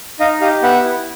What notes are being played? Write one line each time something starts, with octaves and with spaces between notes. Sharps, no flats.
D#4 D#5 F5
G4 D#5 F5
B3 E5 F#5
E4